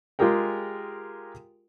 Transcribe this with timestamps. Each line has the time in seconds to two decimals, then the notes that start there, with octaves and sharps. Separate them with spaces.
0.19 G#3 F4 G4 G#4 A#4 G5